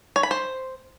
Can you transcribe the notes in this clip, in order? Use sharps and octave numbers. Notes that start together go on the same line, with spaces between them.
C#5
B5
C5